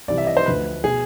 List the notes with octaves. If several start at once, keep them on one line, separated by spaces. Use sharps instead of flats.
C2 C3 E3 D5
E5
D#5
C5
D2 D3 F3 B4
B2 G#4